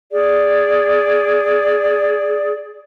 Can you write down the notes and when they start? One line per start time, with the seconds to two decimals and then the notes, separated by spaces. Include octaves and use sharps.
0.11 G#4 D5